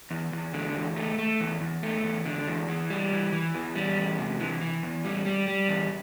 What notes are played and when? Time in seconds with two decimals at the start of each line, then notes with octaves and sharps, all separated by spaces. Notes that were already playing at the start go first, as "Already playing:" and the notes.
0.11 E2
0.33 E2
0.53 D3
0.75 E2
0.96 A3
1.19 A3
1.40 E2
1.61 E2
1.83 A3
2.04 E2
2.26 D3
2.48 E2
2.69 E3
2.90 G3
3.12 E3
3.32 E3
3.55 E2
3.76 G3
3.98 E2
4.18 C3
4.40 E3
4.62 E3
4.83 E2
5.05 G3
5.26 G3
5.48 G3
5.68 E2